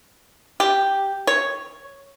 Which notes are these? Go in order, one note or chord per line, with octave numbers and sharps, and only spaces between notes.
G4
C#5